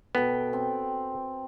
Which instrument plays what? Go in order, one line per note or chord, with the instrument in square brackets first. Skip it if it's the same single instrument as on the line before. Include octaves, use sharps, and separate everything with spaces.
[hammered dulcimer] B2 A4 G5 [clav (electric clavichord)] B3
[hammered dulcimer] C4